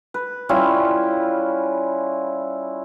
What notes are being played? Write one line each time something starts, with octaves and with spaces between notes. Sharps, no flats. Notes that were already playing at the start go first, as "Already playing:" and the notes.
B4
G3 C#4 E4 F4